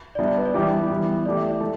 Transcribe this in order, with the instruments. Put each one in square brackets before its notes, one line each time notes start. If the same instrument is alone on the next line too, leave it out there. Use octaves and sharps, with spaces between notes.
[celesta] D5
[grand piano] G3 B3 D4 [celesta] E5
[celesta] D5
B4
D5
[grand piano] E3 G3 B3 D4 G4 [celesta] E5
[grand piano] E3 G3 B3
[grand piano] E3 A3 G4 [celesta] D5
[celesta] E5
D5
[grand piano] A3